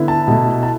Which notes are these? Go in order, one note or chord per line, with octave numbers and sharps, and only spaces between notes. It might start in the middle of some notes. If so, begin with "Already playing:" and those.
Already playing: D3 B3 E4
A5
B2 A3 E4
A5